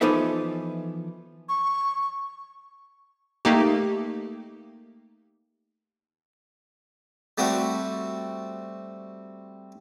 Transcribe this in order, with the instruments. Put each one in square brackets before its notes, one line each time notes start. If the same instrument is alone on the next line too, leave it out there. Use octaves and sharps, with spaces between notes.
[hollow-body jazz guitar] E3 F3 B3 D#4 A4 E5
[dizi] C#6
[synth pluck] A3 A#3 D#4 G4
[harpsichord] G3 A3 C4 F#4